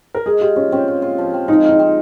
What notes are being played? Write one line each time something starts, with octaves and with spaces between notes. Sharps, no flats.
A#4
G#3 G#4
F4 G4
C#4 F4
C4 C#4
F4
F4
F3
C4
G#3 D#4
D#4 F4
C4